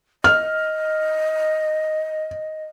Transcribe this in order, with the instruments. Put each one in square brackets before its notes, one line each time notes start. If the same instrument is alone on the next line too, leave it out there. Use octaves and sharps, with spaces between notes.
[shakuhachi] D#5 [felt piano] F6